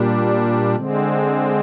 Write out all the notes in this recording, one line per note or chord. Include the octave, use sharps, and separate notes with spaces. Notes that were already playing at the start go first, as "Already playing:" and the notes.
Already playing: A#2 G3 D4
D3 G#3 C4